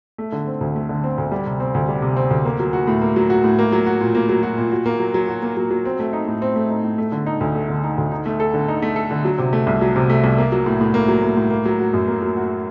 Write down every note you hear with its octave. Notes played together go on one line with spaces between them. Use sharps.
A3
D3
C4
D2
A3
D3
C4
D2
G3
C3
C4
D2
G3
C3
C4
D2
A#3
F#3
F#4
A2
A#3
F#3
F#4
A2
A#3
F#3
F#4
A#2
A#3
F#3
F#4
A#2
F#4
A#3
F#3
F#3
F#4
A#3
F#3
F#3
C4
A3
D#4
A2
C4
A3
D#4
A2
A3
D3
D#4
D2
A3
D3
D#4
D2
D#4
A3
A4
D3
D#4
A3
A4
D3
F#3
C3
A3
C2
F#3
C3
A3
C2
A#3
F#3
A2
A2
A#3
F#3
A2
A2
A#3
F#3
F#4
F#2
A#3
F#3
F#4